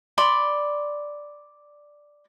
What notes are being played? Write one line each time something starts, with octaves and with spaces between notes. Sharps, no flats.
D5 B5 C6